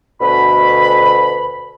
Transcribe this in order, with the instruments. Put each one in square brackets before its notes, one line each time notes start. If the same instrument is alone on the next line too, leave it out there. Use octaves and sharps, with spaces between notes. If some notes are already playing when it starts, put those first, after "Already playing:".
[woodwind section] D2 B2 B5